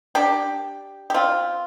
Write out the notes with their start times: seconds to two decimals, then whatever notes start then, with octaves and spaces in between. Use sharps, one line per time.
0.15 D4 G4
1.10 G4
1.14 C4 F4